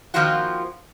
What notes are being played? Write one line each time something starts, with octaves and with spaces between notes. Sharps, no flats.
D#3 F3 A#3 C4 F4 F#4